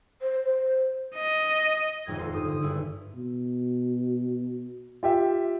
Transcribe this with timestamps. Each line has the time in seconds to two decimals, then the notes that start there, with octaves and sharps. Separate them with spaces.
0.22 C5
0.45 C5
1.15 D#5
2.05 D#1 G#1 F2 G#6 A#6
2.18 F4 A4 C6
2.33 G2 D#6 G6
2.45 D3 D#6
2.62 G#1 G2 E4
3.15 B2
5.03 F4 G4 E5